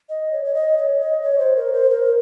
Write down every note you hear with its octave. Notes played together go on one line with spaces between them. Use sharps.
D#5
C#5
C#5
D#5
C#5
D#5
C#5
C5
A#4
C5
A#4